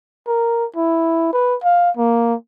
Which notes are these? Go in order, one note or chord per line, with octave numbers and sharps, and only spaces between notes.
A#4
E4
B4
F5
A#3